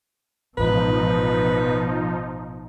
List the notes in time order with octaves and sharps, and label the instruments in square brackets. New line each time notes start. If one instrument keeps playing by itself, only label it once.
[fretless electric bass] A1 E2 G#2 [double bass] B2 [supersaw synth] F3 D#4 [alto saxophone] B4